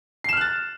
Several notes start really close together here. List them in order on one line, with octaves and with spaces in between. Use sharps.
C7 E7 F6 F#6 A6